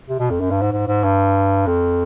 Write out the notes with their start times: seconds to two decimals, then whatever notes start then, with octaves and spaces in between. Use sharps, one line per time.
0.09 C3
0.19 B2
0.30 F2
0.41 F#2
0.51 G2
0.62 G#2
0.72 G#2
0.88 G#2
1.03 G2
1.67 F2